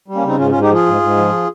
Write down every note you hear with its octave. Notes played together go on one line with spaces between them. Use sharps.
G3
A#3 C#4
C#3 C4 D#4
G#2 C#4 F4
G#2 C#4 F4
D#4 G4
F3 F4 G#4
G#2
G#2
F3